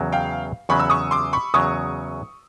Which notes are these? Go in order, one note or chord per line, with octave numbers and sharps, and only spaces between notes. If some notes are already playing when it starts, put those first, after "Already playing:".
Already playing: E2 C#3 F#3
F5 G5
E2 C#3 F#3 B5 C#6
E6
C#6 D#6
C6 D6
B5 C#6
E2 C#3 F#3 C#6 D#6